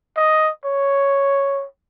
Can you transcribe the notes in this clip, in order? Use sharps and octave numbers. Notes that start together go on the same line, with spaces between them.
D#5
C#5